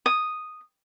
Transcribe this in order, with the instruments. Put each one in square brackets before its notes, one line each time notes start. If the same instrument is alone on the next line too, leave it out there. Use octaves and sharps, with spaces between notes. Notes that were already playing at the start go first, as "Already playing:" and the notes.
[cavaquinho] D#6